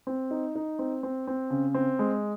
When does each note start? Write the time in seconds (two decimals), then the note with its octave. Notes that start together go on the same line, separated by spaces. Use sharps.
0.07 C4
0.31 D#4
0.55 D#4
0.79 C4
1.03 C4
1.27 C4
1.50 C#3
1.74 C4
1.99 G#3